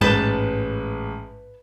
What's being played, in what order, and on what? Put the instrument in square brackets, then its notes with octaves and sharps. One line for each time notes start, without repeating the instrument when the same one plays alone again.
[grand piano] A1 G#3 [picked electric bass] G#2 [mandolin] B4 A5 G6